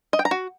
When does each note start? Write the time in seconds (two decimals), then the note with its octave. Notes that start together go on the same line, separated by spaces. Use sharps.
0.13 D#5
0.19 G5
0.25 A#5
0.31 F#4